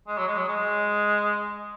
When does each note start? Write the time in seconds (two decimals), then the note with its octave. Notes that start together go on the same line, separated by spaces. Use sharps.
0.08 G#3
0.18 F#3
0.28 G#3
0.38 F#3
0.48 G#3